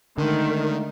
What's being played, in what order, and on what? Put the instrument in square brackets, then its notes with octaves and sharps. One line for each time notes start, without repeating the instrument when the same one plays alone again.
[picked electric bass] D3 [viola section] D#3 [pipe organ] G#3 A3 D#4